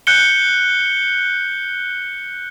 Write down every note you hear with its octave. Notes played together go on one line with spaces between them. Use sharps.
F#6 G6 C#7 G7